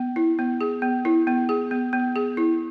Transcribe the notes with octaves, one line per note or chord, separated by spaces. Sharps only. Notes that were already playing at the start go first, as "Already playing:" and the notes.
Already playing: B3
E4
B3
G#4
B3
E4
B3
G#4
B3
B3
G#4
E4